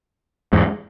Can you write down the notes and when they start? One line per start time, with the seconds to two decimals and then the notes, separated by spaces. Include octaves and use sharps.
0.53 E2 G#2